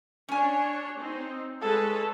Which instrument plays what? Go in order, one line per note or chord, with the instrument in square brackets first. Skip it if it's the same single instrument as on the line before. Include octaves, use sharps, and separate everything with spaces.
[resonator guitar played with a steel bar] C#4 G#5 [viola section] D4 C#5
[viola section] C4 D#4
[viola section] G#3 B4 C#5 [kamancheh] A4 A5